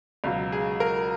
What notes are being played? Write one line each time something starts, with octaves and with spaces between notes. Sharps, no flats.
C#2 B2 F#3 F5
G#4
A#4